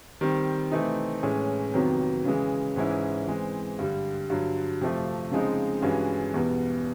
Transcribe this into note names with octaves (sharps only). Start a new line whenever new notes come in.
D#3 G3 C4
C3 E3 A3 C4 D#4
A2 E3 G#3 C#4
F2 C3 D#3 F#3 B3
C#3 E3 G#3
G#2 E3 G#3 C#4 E4
E3 G#3 C4
G2 D3 G3
G2 D3 F#3
F2 C3 F3 A3
C#3 F3 G#3 C4 D#4
G2 E3 G#3 C#4 F#4
E2 B2 G3 B3